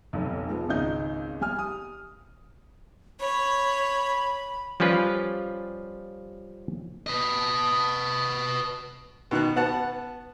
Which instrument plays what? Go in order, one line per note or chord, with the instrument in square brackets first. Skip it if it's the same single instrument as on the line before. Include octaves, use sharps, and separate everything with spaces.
[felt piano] F1 B1
F3 G#3 B3
G#1 C#2 D#4 G6
G3 G#5 F6
D#6
[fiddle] C#5 [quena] B5
[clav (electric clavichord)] F3 G3 C#4 F4 B4
[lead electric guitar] B4 D#5
[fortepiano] B2 D#3 F#6
B3 F#5 A5